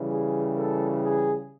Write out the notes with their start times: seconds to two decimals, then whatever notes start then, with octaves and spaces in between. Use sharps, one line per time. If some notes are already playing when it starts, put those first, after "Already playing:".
Already playing: C#3 E3 G3
0.13 G#4
0.58 A4
1.03 G#4